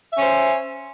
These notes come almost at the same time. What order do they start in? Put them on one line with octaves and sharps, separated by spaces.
E5 C#4 C5